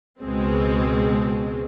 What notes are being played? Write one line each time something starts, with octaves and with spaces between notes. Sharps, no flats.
C#2 B2 G#3 C4